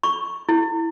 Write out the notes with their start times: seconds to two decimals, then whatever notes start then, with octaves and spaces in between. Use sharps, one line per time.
0.03 C#6
0.49 E4